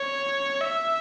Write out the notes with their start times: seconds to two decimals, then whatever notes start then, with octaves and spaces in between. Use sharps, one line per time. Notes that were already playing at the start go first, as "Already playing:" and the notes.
Already playing: C#5
0.61 E5